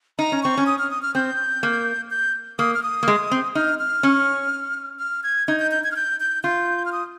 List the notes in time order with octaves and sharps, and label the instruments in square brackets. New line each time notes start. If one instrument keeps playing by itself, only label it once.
[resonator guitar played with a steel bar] D#4 [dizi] A#5
[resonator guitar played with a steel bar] C#4
[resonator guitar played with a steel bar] C4 [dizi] C#6
[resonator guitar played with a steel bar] C#4
[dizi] D#6
F6
D#6
F6
[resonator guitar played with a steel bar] C4 [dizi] G6
[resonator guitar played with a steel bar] A#3
[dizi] G6
[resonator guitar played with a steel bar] A#3 [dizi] D#6
[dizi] F6
D#6
[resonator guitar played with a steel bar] A#3
G#3
C4
[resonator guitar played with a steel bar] D#4 [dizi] F6
[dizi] F6
[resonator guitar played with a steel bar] C#4
[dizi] F6
G#6
[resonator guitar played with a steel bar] D#4 [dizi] G#6
[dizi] G6
G6
G#6
F6
G6
G6
[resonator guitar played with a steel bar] F4 [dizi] G6
[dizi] F6
D#6